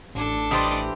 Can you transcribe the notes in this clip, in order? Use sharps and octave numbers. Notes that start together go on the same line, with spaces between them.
A1 D4 A4
E3 G3 G4 C5 D5 D#5